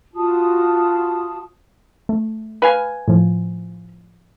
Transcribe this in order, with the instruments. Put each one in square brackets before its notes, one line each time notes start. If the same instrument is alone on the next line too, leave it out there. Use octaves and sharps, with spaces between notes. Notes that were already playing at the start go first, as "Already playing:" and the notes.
[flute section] F4 F#4 A5 D#6
[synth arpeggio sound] A3
[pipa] B4 F5 G#5
[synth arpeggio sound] A2 F3